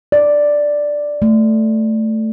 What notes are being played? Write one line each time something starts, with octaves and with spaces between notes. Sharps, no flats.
D5
A3